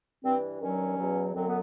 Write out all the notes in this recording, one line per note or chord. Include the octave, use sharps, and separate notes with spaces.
G2 E3 C4
G2 D#3 F#3 C#4
E2 B2 F#3
F#2 D3 F#3 C4
B3